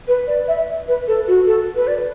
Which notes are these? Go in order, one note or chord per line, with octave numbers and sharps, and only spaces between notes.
B4
D5
E5
B4
A4
F#4
A4
B4
D5